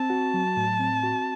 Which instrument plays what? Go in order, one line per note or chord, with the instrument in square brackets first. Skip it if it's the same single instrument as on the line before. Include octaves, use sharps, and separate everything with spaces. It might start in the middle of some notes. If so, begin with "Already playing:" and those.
Already playing: [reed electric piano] C4 [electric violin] A5
[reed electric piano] F#4
F#3
A2
C4
F#4